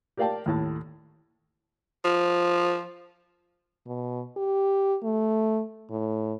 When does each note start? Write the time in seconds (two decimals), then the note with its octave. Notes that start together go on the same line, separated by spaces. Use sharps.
0.17 G4 A#4 D5 F5 G5 A5
0.46 D#2 A2 A5
2.05 F3
3.87 B2
4.37 G4
5.04 A3
5.90 A2